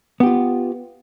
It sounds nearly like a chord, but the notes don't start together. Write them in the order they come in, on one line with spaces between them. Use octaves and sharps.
B3 G4 F4